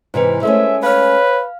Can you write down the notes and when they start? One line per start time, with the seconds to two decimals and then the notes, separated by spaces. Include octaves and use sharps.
0.14 G#2 C3 E3 B4 C5
0.43 G#3 A3 C#4 E5
0.83 B4 C#5 F5 F6